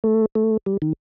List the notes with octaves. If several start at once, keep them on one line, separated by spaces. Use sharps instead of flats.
A3
A3
G3
D#3